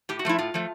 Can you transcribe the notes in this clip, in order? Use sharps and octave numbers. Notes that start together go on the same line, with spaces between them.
A2 G4
F#4
F3 A3 E4
A2 F4
F3 A3